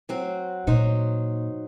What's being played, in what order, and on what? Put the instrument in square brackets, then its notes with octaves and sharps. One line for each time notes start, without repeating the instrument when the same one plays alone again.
[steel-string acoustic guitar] F#3 C4 F#4
[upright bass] A#2 [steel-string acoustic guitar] F#3 D#4 C5